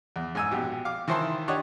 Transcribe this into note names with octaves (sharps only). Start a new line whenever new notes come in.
E2
G#2 G#5 E6
A#1 B2 G4
F5 D6
D#3 E3 E4 C5 A5 C6
D4 G4 C#5 D#5 F#5